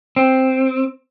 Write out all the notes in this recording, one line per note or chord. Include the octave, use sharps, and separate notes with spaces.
C4